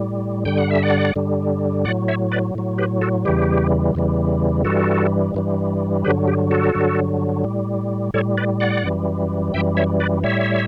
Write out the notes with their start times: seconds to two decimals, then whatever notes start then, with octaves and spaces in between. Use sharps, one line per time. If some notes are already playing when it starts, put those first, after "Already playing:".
Already playing: A2 G3
0.45 G2 D3 G3 G5
0.58 F#5
0.70 E5
0.83 D5 F#5
1.16 G2 D3 G3
1.85 A2 D5 F#5
1.88 F#3
2.08 C#5 E5
2.32 B4 D5
2.55 A2 F#3
2.78 G4 B4
3.01 F#4 A4
3.25 E2 C#3 E3 G3 G4
3.95 E2 C#3 E3 G3
4.65 G2 E3 G3 F#4 A4
5.34 G2 E3 G3
6.04 G2 D3 F#3 G4 B4
6.28 G4
6.51 F#4 A4
6.74 G2 D3 F#3
7.44 A2 G3
8.14 A2 G3 A4 C#5
8.37 B4 D5
8.60 D5 F#5
8.84 F#2 E3 G3
9.54 F#2 E3 G3 E5 G5
9.77 C#5 E5
10.00 B4 D5
10.23 A2 G3 C#5 E5